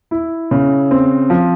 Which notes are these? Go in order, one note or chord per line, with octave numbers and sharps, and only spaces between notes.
E4
C#3
C4
F3